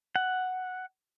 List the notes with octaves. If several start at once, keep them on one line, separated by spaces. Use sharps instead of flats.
F#5